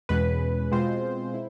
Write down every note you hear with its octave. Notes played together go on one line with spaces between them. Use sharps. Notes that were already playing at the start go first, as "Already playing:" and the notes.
E2 B2 G#3 C#4 B4
B2 G#3 C4 F4 C5
E4